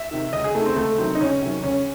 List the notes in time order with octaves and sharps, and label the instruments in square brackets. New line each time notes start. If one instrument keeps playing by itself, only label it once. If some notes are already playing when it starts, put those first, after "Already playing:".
Already playing: [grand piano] E5
C3 D#3
C#2 D#5
G#4
C3 D#3 A3
C4
C#2 A3
C3 D#3 F#3 C4
D#4
C#2 C#4
C3 D#3 F#3
C#2 C#4